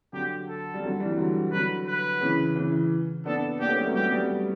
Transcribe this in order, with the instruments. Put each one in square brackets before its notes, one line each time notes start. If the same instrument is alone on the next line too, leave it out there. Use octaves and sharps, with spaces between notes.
[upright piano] D3 F#3 [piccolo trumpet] G4
[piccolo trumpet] A4
[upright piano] G3
D3 F#3
E3 G3
D3 F#3
[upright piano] D3 F#3 [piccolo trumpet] B4
[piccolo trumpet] B4
[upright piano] C#3 E3
C#3 E3
[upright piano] B3 D4 [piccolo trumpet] A4
[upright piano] B3 D4 [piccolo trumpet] G4
[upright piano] A3 C#4
G3 B3
F#3 A3
[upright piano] G3 B3 [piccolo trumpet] G4
[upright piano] G3 B3